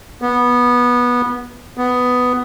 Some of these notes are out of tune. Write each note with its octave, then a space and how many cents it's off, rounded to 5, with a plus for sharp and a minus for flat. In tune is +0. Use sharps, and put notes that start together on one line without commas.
B3 -15
B3 +10